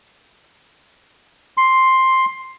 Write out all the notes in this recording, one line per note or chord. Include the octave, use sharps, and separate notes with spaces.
C6